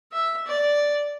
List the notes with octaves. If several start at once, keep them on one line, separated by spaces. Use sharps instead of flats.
E5
D5